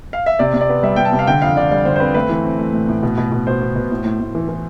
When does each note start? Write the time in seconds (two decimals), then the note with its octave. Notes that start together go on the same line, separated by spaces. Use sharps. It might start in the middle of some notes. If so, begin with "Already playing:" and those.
0.13 F5
0.26 E5
0.39 C3 D5
0.54 C3
0.61 D5
0.69 B3
0.83 G3 E5
0.96 G3 G5
1.05 A5
1.12 C3
1.19 F5
1.27 D3 G5
1.42 F2 F5
1.57 D3 D5
1.71 G3 D5
1.85 D3 C5
1.96 C5
2.00 C4 B4
2.14 A3 B4
2.29 E3
2.44 C4
2.58 A3
2.73 A2
2.88 A2
3.03 B2
3.17 B2
3.32 B2
3.47 B2 C5
3.61 B3
3.75 B2
3.91 A2
4.05 A2
4.20 A2
4.35 E3
4.49 E3